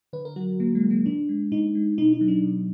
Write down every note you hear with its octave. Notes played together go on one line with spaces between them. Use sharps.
D3 B4
A#4
F#3 F#4
D3 A#3
G#3
F#3
A#3
A#2 D4
G#3
A#2 D#4
G#3
B2 D#4
D#4
F#3
D4
B2